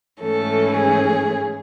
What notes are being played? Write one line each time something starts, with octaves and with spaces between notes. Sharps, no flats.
G#2 E3 A3 C#4 A4
G#4